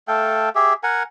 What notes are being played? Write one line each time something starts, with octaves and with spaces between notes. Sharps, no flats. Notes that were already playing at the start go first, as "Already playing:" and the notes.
A3 A4 F5 G5
G4 G#4 E5
A#4 F#5 G#5